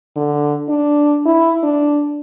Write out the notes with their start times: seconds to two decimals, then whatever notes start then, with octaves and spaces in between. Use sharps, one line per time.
0.16 D3
0.69 D4
1.26 E4
1.63 D4